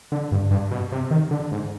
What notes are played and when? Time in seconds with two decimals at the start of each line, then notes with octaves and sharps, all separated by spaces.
0.12 D3
0.32 G2
0.51 G2
0.71 B2
0.92 C3
1.11 D#3
1.31 D3
1.52 G#2